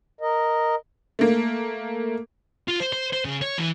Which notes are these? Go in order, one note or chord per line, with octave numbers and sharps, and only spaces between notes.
A#4 D#5
A3 A#3
F4
C5
C5
C5
C#3
C#5
E3